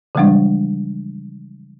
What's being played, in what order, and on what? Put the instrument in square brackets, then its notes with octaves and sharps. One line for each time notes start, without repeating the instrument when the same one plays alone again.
[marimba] C#3 E3 F3 G3 G#3 D4